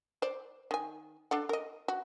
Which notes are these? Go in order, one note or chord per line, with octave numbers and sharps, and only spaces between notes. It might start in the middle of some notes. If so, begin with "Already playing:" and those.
C5 D5
D#3 G#5
D4 A4 F#5
A#4 D#5
F#4